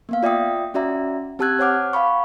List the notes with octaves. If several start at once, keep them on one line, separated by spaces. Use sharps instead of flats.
A#3 B3 F5
F4 D5 E5 G5 D#6
C#4 F#4 D5 E5 A#5
C4 G4 A5 E6 F#6 G#6
C5 C#5 F#5 D6 F6
F5 A5 B5 C#6